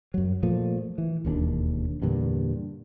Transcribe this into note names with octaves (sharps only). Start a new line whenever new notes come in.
F#2 F#3
A#2 F3 A3
E3
E1 D#2 C#4 D4
E2 G2 A#2 D3